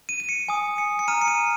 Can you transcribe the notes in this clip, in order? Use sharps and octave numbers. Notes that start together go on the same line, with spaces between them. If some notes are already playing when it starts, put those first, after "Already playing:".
D#7
D#7
C#7
G#5 D#6
C#7
C#7
A#5 F6 D#7
C#7
D#7